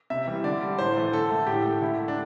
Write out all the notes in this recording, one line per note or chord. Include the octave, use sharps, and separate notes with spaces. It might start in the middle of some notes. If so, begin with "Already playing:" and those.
C3 E5
E3 G3
D3 D5
G3
A2 C5
E3 A3
D3 A4
A3
A2 G4
A3
D3 E4
A3
D4